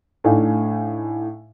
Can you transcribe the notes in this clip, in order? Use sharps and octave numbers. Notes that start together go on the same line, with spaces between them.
A2 A3 D4 D#4 F5 G#5